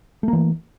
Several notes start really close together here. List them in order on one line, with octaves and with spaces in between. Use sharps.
A3 A#3 E3